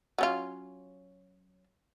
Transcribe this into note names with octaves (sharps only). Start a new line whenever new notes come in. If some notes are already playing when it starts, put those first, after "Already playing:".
F#3 C#4 F4